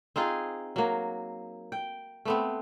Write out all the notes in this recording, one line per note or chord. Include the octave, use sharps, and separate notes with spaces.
C4 D#4 F4 G#4
F#3 A#3
G5
A3 B3 C4